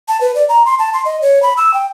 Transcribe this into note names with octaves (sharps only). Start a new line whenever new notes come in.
A5
B4
D5
A#5
C6
A5
C6
D#5
C#5
B5
E6
G5